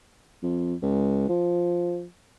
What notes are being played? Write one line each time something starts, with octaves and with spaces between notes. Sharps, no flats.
F2
C#2
F3